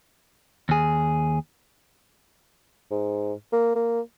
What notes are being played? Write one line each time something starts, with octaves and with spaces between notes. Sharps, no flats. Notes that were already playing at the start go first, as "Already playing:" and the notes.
D#2 G#4
G#2
A#3
A#3